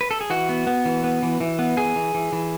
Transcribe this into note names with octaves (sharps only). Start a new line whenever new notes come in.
B4
A4
G#4
E3 F#4
B3
B3
E3
B3
E3
E3
B3
E3 G#4
E3
E3
E3